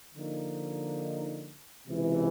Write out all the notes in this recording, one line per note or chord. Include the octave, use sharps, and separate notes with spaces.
D3 F3 A#3 D#4
C#2 C3 E3